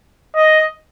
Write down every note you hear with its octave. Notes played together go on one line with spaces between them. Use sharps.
D#5